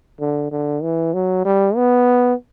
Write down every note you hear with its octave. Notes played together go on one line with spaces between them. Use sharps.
D3
D3
E3
F#3
G3
B3